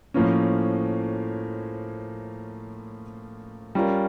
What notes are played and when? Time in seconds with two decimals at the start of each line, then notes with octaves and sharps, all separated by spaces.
0.14 A2 F3 A#3 C#4
3.75 G3 C#4 F4 A#4